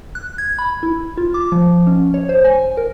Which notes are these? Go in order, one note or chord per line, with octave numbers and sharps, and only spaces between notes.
F#6
G#6
B5
E4
F4
D6
F3
C#4
C#5
C5
G#5
A#4